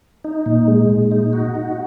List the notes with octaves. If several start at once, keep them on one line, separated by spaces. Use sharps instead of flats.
D#4
A#2
G#3
A#2
D#4
F#4
D#4